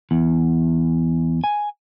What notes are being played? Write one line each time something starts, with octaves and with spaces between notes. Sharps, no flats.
E2
G#5